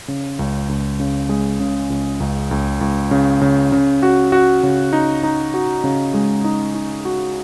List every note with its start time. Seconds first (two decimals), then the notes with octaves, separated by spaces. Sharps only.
0.08 C#3
0.39 C#2
0.69 C#2
1.00 C#3
1.29 G#3
1.60 C#3
1.90 C#2
2.20 C#2
2.51 C#2
2.81 C#2
3.11 C#3
3.41 C#3
3.72 C#3
4.03 F#4
4.32 F#4
4.63 C#3
4.93 D#4
5.23 D#4
5.54 F#4
5.84 C#3
6.14 G#3
6.44 D#4
6.74 D#4
7.05 F#4